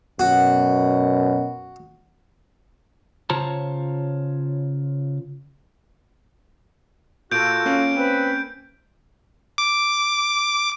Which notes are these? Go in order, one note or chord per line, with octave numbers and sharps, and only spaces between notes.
F#2 B2 F#4
C#3 F4 C5 C#5 A5 A#5
A#2 F4 F#4 A4 G6 D7
A#3 C#4 F5
C4 B4
D6